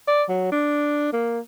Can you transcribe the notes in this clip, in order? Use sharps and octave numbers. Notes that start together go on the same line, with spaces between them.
D5
F#3
D4
A#3